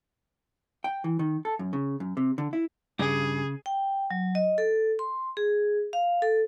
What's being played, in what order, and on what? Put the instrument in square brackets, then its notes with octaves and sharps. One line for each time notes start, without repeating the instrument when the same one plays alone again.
[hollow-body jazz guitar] G5
E3
D#3
A4
F#2
C#3
F#2
C3
D3
E4
[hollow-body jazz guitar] G2 [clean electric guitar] C#3 [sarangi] G#4
[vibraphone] G5
F#3
D#5
A4
C6
G#4
F5
A4